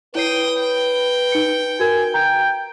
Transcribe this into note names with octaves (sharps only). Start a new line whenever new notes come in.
E4 B4 C#5 G5 D#6 C7
G5
D#4 C#7
F#4 A#4 G#5
G5 A#5